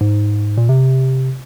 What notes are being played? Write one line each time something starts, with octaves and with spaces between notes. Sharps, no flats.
G#2
A#2
C3